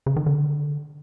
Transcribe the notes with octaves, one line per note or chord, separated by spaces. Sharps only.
C#3
D#3
D3